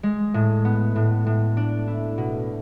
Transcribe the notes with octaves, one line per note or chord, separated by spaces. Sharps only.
G#3
A2
B3
A2
A2
D4
E4
B2